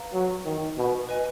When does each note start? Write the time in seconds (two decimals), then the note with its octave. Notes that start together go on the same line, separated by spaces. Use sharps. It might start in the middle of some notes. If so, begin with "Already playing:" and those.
Already playing: B4 F5 A#5
0.13 F#3
0.45 D#3
0.77 B2
1.09 B4 D#5 G#5